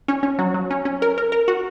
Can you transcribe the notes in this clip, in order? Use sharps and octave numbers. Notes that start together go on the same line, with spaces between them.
C#4
C#4
F#3
F#3
C#4
C#4
A#4
A#4
A#4
F#4